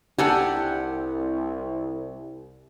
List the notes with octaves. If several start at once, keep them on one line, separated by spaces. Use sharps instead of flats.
C2 D4 G4 A4 F#5 G#5